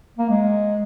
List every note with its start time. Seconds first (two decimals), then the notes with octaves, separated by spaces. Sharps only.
0.18 A#3
0.29 G#3